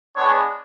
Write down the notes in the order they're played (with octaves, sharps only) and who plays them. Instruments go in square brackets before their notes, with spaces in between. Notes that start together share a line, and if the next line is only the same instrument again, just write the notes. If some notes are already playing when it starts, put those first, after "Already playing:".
[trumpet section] G#3 B3 D4 C#5